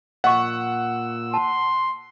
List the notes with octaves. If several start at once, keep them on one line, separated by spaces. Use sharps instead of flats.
A#2 D#5 F5 F#5 C#6 E6
A5 C6